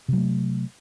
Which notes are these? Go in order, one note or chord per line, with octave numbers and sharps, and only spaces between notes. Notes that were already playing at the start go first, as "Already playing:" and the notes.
C3 F#3 A3